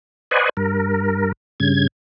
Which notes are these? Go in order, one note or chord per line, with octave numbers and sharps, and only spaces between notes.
B4 C5 D5 D#5 F#5 G#5
G2 A#4
G2 C#3 G#6